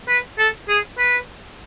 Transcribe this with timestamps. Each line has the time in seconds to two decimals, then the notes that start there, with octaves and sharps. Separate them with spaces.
0.08 B4
0.38 A4
0.69 G#4
0.98 B4